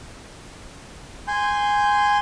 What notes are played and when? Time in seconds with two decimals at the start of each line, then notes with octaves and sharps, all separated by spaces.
1.28 G#5 C6 G6